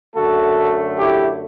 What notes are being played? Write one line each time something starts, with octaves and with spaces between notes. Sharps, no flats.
F#2 D3 A3 F#4 A4
E4 G4